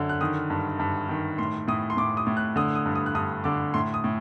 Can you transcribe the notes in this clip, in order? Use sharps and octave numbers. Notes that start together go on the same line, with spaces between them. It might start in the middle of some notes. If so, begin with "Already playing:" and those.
Already playing: F#2 D3
F#6
D#3 D#6
G2
G2
D#3
A2 C6
A2 D#6
C6
A2 D6
D#6
A2
F#6
D3 D#6
D#6
G2
D#6
F#6
G2 D#6
D3 D6
A2 C6
D#6
A2